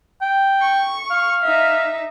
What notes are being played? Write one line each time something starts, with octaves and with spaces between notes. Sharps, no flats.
G5
C#6
F5
D#4 E5